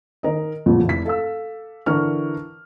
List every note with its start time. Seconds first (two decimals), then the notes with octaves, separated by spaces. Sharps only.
0.23 D#3 A#4 D#5
0.66 A1 F2 A#2 C#3 F3
0.85 F1 E4 B6
1.05 A4 F5 E6
1.86 D3 E3 A#4 C#6 F6